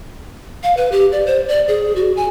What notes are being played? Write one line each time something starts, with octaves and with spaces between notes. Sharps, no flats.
F5
B4
G4
D5
C5
D5
G#4
F#4
G#5